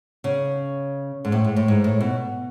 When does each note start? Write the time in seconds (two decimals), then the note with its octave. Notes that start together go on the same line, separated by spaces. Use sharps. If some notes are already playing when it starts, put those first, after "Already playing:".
0.24 C#3
1.25 G#2
1.32 A2
1.44 G#2
1.56 A2
1.68 G#2
1.84 A2
2.00 B2